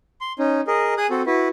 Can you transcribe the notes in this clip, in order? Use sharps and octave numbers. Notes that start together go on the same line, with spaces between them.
C6
C#4 D#4
G#4 A#4 D#5
G#4 G#5 D#6 F#6
C4 F#4 A4
E4 F#4 B4